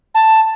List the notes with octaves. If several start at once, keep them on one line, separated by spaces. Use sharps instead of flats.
A5